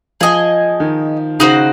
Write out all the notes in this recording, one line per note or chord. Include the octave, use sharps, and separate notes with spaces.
F3 G#4 D#5 G#5
D#3
C#3 D#4 F#4 C5